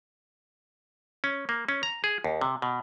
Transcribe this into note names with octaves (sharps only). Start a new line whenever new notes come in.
C#4
A#3
C#4
A#5
G#4
D#2
C3
B2